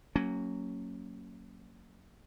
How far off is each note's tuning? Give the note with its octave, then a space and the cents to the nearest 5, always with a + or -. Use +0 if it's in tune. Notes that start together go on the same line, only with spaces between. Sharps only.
F#3 +0 A#3 -20 C#4 +0